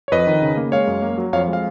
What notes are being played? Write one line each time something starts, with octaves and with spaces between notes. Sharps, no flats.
C#5
F2 B4 D#5
D#3
C#3
A#3
G#3 C#5 F5
F#2
A#3
F#3
F2 C#5 F5
G#3
F5